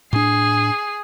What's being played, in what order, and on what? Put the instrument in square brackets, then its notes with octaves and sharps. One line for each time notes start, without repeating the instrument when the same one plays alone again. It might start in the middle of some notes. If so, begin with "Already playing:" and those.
[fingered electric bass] A2 D4 [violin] G#4 C7